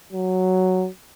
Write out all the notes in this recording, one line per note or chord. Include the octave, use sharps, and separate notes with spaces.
F#3